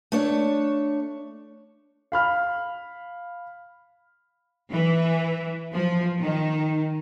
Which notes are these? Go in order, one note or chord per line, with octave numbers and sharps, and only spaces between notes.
A3 D4 C#5
F5 B5 F6
E3
F3
D#3